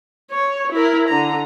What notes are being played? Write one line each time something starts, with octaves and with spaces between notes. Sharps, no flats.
C#5
E4 A#4
D3 A#5